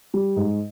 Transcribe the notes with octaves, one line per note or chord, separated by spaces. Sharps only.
G3
G#2